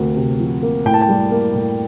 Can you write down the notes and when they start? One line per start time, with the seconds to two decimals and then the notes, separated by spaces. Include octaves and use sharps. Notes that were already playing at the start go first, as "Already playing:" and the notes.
Already playing: D2 C3 A#3
0.16 C3
0.39 F3
0.63 A#3
0.85 A2 G5
0.94 A5
1.01 G5
1.09 G3
1.32 A#3
1.55 A2